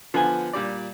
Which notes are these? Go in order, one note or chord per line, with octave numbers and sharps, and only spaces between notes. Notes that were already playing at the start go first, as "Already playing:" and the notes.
D3 F3 B3 F4 G#5
A#2 G3 D5